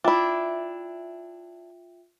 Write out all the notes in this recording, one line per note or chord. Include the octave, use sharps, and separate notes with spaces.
D4 E4 F4 E5 G5